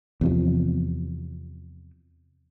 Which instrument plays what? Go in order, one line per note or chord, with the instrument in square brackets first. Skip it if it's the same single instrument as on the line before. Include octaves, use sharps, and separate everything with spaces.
[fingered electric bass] E2 C3 F3